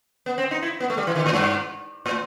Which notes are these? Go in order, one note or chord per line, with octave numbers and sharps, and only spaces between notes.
B3
C4
D#4
E4
B3
A3
G3
E3
D#3
A2
G2
A2